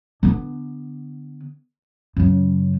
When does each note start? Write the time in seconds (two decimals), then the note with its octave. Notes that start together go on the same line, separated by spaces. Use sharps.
0.23 D3 B3
2.16 F#2 C#3